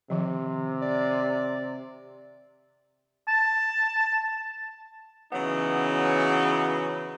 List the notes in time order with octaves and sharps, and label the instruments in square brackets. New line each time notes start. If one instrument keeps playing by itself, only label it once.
[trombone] C3 [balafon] D#3 F3
[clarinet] D5
[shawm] A5
[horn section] C#3 E3 F#3 B3 D#4